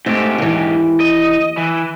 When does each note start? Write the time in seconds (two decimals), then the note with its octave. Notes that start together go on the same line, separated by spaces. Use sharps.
0.06 G#2 A3 C4 G4 E5
0.38 D#2 E3
1.01 D#5
1.57 E3